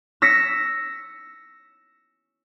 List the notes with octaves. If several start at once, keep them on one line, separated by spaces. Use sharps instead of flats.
E6 A#6 B6 C#7